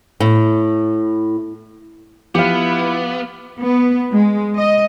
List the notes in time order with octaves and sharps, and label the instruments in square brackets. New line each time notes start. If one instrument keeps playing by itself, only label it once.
[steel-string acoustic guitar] A2
[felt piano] F3 [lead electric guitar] B3 [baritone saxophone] E4 [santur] G4 F5
[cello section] B3
G#3
D#5